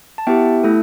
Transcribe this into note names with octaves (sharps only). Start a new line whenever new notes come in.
A5
B3 E4 G4 E5 G5
A3 E4 A4